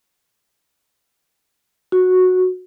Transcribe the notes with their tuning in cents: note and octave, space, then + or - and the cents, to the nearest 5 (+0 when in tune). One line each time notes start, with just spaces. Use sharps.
F#4 -10